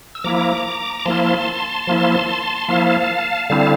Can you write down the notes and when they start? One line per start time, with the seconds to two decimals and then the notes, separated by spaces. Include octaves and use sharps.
0.15 E6
0.24 F3 A#3 E4 A#5 D6
0.99 D6
1.06 F3 A#3 E4 A5 C6
1.87 F3 A#3 E4
2.68 F3 A#3 E4 F5 A5
3.50 D3 G3 C4 E4 F5 A5